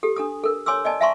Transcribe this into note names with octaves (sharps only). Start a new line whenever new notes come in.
G4 A4
D4 A4 D#6
A4 A#4
C#5 G#5 C6 D6 E6
D5 D#5 G#5 A5
E5 F5 G#5 A#5 C6 C#6